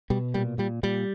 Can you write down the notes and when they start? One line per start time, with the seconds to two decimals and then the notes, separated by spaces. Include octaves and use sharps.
0.10 B2 G3
0.34 A#2 G3
0.58 A#2 G3
0.83 A#2 G3